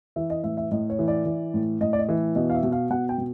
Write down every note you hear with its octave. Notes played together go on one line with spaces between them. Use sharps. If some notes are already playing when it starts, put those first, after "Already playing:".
E3 E5
D#5
A2 E5
E5
A2 D#5
C#5
E3
D5
E3
A2
A2 D#5
D5
D#5
E3
B2 D#5
F5
E5
B2
F5
B2 F#5
G5
B2